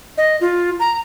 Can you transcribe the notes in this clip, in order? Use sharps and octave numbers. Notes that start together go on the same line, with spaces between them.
D#5
F4
A#5